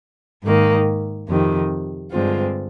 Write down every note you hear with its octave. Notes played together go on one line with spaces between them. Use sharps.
G#2 D#3 A#3
F2 C3 D#3
G2 D3 G#3 C4 F4